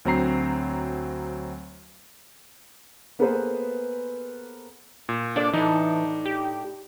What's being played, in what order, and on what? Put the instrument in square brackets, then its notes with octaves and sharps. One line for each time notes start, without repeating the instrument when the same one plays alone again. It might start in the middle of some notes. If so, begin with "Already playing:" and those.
[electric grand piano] D2 F#3 C4 A#5 C7
[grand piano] A#3 B3 G#4 A4 B4 C5
[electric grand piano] A#2
[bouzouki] A#3 A4 D5 [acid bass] D4
[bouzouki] A2 D4 [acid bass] E3 [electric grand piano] D#4
[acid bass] G4